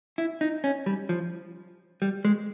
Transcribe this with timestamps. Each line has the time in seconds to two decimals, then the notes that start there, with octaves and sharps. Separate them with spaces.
0.18 E4
0.41 D#4
0.64 C#4
0.86 G3
1.09 F3
2.02 G3
2.25 G#3